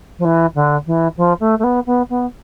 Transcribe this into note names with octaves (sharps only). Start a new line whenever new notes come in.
F3
E3
D3
E3
F3
A3
A3
B3
B3
B3